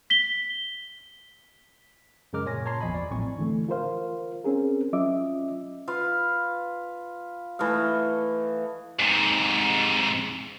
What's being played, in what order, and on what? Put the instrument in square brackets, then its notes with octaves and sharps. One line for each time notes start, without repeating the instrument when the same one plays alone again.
[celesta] B6 G7
[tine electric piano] F#2 C#3 G#3 A#4 D6 F6
A#2 F4 C#5 G#5 A#6
C#5 A5 A#5 C6 C7
G#1 E2 F3 D#5 G#5 B5
D5
A1 A2 F#3 C4 G#5 C#6
[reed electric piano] D3 E3 A3
F4 A#4 C5 F5
C4 C#4 G#4 A#4
F#3 C#4 F4 D#5 E5 D6
[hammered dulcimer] F4 B4 F5
E3 A3 D#5 F5
[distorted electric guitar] G#2 C3